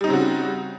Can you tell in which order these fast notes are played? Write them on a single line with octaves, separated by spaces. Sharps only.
G3 D#4 C4 C#3 F#4